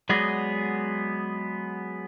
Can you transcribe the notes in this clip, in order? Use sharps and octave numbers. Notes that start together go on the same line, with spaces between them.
F#3 G#3 B3 G#4 D5 D#5